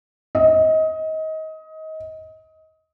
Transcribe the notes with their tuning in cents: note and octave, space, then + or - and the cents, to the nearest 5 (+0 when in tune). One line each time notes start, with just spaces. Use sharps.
D#5 +25